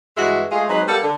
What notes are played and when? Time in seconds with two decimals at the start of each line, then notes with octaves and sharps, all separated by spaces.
0.17 G2 E3 G#3 F#4 E5
0.52 G#3 A3 F4 G#4
0.69 F#3 G#3 C4 D#4 B4
0.87 G3 A#3 B3 A4
1.03 D3